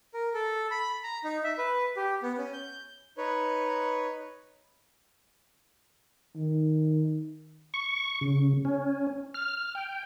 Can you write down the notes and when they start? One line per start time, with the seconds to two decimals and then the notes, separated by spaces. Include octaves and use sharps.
0.14 A#4
0.34 A4
0.71 B5
1.04 A#5
1.24 D#4
1.44 E5
1.58 B4
1.97 G4
2.23 B3
2.38 C#4
2.53 G6
3.18 D#4 B4 C#5
6.36 D#3
7.74 C#6
8.21 C#3
8.65 C#4
9.34 F6
9.75 G5